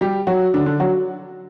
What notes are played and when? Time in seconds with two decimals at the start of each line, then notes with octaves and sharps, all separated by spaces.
0.01 G3 G4
0.27 F#3 F#4
0.54 D3 D4
0.66 D3 D4
0.80 F#3 F#4